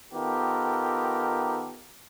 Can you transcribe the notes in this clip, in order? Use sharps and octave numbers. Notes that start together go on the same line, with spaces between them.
D#3 B3 F4 G4 A4 A#4